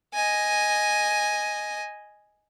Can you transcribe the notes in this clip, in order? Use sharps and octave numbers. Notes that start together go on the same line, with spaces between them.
D#5 G#5